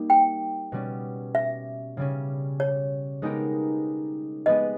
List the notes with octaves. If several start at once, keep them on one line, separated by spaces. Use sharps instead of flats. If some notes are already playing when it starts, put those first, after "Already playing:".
Already playing: G3 A#3 D#4 G4
G5
B2 G3 C#4
E5
C#3 G3 C#4
C#5
G#3 B3 D#4 G4 A#4
G#3 B3 G4 B4 D#5